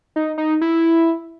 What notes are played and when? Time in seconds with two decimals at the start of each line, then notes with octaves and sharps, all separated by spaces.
0.16 D#4
0.38 D#4
0.61 E4